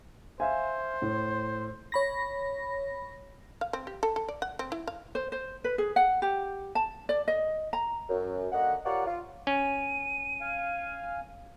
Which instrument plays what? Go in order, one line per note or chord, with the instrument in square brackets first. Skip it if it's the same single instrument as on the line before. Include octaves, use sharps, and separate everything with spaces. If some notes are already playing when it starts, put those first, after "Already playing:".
[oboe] C5 [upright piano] E5 F5 G#5
[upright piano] A2
[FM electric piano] C#5 B5 A#6
[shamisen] F5
C4
G4
A4
A4
D5
F#5
C4
E4
F5
[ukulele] C5
C5
B4
G#4
F#5
G4
A5
D5
D#5
A#5
[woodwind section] F#2
D3 A#3 F#4 D#5 F#5
F4 G4 A#4 C#5 D5 F#5
F4
[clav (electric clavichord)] C#4 [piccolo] D#7
[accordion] F5 G#5